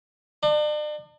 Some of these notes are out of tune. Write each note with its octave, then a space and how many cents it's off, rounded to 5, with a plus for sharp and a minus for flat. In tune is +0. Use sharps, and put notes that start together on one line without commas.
D4 +40